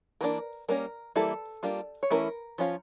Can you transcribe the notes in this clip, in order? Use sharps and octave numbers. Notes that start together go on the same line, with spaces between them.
E3 A#3 D4 A#4
G3 A#3 C#4 A#4
E3 G3 A#3 E4 A4
G3 A#3 D4 F4
C#5
E3 A3 C#4 E4 A#4
F3 C#4 F4